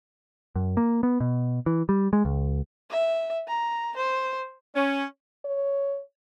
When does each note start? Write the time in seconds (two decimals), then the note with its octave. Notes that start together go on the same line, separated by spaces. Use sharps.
0.56 F#2
0.77 A#3
1.03 B3
1.20 B2
1.66 E3
1.89 G3
2.13 G#3
2.25 C#2
2.90 E5
3.48 A#5
3.96 C5
4.75 C#4
5.45 C#5